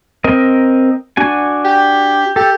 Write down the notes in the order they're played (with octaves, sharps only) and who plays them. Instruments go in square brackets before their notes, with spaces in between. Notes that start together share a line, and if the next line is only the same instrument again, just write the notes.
[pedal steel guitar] C4 A#4 D#5
D4 F#4 G#5
[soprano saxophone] G4
[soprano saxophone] G4 [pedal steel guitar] A4